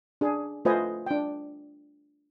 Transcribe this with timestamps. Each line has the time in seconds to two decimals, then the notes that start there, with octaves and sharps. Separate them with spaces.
0.21 D4 G#4
0.65 A3 F4 B4 C5 D#5 G#5
1.06 D4 G5